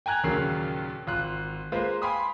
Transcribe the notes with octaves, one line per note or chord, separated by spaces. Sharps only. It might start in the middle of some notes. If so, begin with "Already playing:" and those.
G5 G#5 A#5 F#6 G#6 F7
D#2 A#2 C#3 F#3 C7
G#1 F4 C6 F#6
G#3 A#3 F4 B4 C5
F5 G5 G#5 B5 C6 D#6